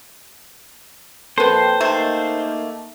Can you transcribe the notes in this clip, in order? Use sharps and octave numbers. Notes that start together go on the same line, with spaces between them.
F2 A#3 A4 B4 C5 G5
C3 A3 A#3 D#4